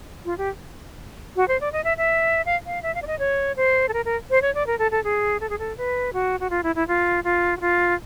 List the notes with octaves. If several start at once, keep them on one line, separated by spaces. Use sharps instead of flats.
F4
G4
F#4
C5
D5
D#5
E5
E5
F5
F5
E5
F5
D5
D#5
C#5
C5
A4
A#4
A#4
C5
C#5
D5
A#4
A4
A4
G#4
A4
G#4
A4
B4
F#4
F#4
F4
E4
E4
F4
F4
F#4
F4